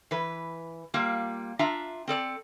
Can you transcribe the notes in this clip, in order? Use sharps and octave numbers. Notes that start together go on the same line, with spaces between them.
E3 B4
G3 A#3 F4
D4 F4 E5 A#5
C4 A4 D5